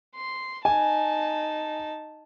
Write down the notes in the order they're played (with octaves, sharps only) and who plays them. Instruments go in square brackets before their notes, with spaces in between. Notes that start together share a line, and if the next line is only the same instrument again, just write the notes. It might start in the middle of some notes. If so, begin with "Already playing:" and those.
[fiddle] C6
[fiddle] D#4 A5 [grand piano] G#5